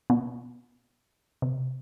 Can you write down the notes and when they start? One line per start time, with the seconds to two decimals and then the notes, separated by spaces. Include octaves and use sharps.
0.10 B2
1.42 C3